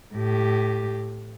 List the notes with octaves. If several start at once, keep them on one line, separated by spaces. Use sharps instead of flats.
A2 G4